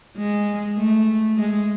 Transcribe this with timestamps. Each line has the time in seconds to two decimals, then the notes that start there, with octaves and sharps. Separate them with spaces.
0.17 G#3
0.78 A3
1.37 G#3